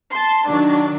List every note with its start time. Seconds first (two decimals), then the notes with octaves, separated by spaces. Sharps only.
0.11 A5 C6
0.47 D#3 F#3 D4